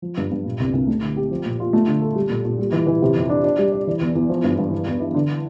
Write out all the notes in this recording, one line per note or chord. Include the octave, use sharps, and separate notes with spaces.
F3
G2
G2
A#2
C2
C2
A3
D3
G4
F3
A#2
F4
A3
D3
A4
G3
A#2
A#2
G3
E3
E3
C3
F2
D4
D4
G3
D5
E3
E2
E2
F3
G2
G2
E3
E2
E4
D3